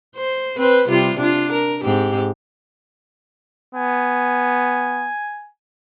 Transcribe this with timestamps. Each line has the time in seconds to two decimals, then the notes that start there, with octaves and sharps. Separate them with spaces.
0.16 C5
0.57 C4 B4 C5
0.89 C3 G3 F4
1.18 D4 F4
1.53 A#4
1.84 G#2 C4 G4
3.75 B3 G#5